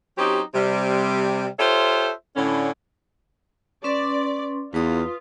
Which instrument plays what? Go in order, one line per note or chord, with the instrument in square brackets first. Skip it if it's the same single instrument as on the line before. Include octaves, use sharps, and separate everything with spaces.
[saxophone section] F#3 C4 C#4 D#4 G4
C3 G3
F4 G4 A4 C5 C#5 E5
A2 D3 C#4
[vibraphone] C#4 B4 C6 [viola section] D5
[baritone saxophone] E2 [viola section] F4 [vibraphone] B4 D#6